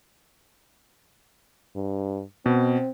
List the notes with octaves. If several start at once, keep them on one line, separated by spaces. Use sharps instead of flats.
G2
B2 C4